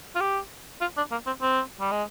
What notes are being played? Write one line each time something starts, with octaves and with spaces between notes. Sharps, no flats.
F4
G4
F4
D4
A#3
C4
C4
G3
G#3